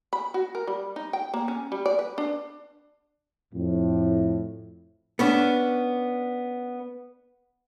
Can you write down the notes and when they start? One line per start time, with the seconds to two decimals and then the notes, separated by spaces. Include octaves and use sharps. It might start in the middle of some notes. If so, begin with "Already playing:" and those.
0.13 B5
0.34 F#4
0.55 A#4
0.67 G3
0.96 D#4
1.13 G5
1.34 A#3
1.48 C#4
1.72 G3
1.86 D5
1.99 B4
2.18 D4
3.54 F2 A2
5.19 B3 C#4 D4